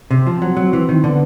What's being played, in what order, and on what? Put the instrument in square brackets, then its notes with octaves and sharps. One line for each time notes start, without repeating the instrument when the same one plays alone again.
[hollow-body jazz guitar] C3 [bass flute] C4
[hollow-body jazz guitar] F3
[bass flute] C4
[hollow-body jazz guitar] F#3
F#3
E3
D#3
[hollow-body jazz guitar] D3 [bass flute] B3